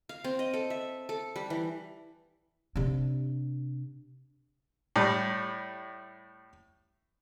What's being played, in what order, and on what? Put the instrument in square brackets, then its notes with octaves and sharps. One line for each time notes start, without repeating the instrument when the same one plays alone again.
[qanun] F5
C4
D#5
A4
E5
A4
G3
E3
[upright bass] C3 D4
[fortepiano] A2 G3